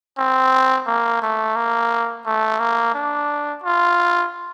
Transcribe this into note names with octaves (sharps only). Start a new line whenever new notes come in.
C4
A#3
A3
A#3
A3
A#3
D4
F4